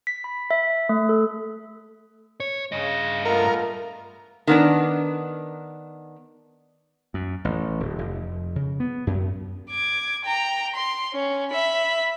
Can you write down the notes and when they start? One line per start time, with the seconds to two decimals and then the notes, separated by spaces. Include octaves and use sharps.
0.07 B6
0.24 B5
0.51 E5
0.89 A3
1.09 A4
2.40 C#5
2.72 G2 C#3 D#5
3.25 A3 B3 F4 A#4
4.47 D#3 B3 D4
7.14 F#2
7.45 A1
7.80 D1
7.99 F1
8.56 C#3
8.80 B3
9.07 F#2
9.70 D6 G#6
10.25 G5 A#5
10.75 C6
11.13 C#4
11.52 E5 B5